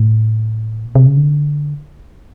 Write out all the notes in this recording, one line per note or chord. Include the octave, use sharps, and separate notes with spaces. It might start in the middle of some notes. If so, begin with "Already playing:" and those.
Already playing: A2
A#2
C3
C#3
D3